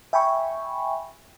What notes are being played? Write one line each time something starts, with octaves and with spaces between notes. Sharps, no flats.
E5 G5 G#5 B5 C#6